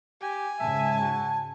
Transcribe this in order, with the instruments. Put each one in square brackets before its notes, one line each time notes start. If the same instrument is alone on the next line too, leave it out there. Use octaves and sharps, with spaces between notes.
[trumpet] G4 [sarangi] G#5
[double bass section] G#2 C#3 [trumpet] E5 [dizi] A5
[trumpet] F#4